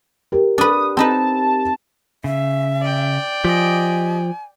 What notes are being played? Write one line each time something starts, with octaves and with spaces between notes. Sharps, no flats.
G4 A#4
D4 B4 D#6
C4 D#4 B4 A5
C#3 E5
D5 G5
F3 G4 D#5 G#5